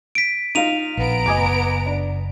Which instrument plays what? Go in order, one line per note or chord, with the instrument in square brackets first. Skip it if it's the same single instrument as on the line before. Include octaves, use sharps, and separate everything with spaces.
[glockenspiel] B6 D7
[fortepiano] D#4 F4 F5 [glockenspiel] D#7 F7
[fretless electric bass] A#1 [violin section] B3 A#5 D7
[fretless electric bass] F#1 [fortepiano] D#5 G#5 D6
[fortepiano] D4